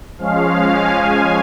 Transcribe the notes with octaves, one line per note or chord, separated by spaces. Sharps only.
F3 G#3 C#4 F5
G#5